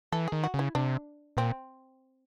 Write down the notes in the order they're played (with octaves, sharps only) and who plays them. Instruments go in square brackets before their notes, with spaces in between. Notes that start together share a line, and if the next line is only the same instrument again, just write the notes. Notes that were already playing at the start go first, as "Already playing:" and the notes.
[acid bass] E3 [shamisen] A4
[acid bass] D#3 [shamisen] G#4
[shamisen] F#4
[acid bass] C#3
[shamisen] E4
[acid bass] C3 [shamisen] D4
[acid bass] A#2 [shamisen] C4